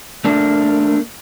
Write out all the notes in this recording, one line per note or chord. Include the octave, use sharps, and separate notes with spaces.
A3 A#3 D4